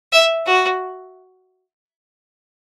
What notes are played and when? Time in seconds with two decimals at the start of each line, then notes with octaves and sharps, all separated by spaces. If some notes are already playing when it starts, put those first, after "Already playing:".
0.13 E5
0.46 F#4